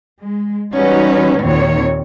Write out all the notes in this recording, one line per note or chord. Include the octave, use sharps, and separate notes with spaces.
G#3
E3 G3 C#4 D#4 F#4 B4
D#2 A#2 D#3 C4 C#5